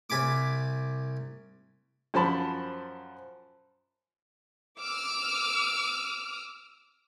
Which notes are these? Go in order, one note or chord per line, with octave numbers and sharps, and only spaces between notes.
C2 G#5 B5 D6
F#2 F3 C5 A5 B5
D6 E6 F6